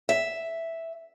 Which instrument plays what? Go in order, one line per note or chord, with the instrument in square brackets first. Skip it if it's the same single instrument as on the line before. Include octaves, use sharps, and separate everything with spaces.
[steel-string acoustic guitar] E5